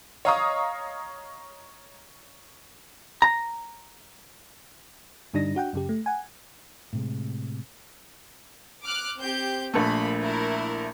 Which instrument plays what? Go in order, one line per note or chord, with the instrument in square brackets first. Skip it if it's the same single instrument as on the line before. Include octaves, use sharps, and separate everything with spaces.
[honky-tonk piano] C#5 D#5 F5 A#5 C#6 D#6
[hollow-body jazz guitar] A#5
[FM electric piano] G2 D3 G3 D4 D#4 A#6
D4 F#4 F#5 G5
F#2 C#3 G4
A3
F#5 G#5
[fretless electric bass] A2 C3 G#3
[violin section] D6 F6 F#6
C4 G4 G6
[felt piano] A#1 A3 [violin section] A#3 B5
[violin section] E4 A#4